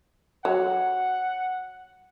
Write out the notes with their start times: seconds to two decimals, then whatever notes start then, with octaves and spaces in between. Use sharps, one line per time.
0.45 F#3 F#5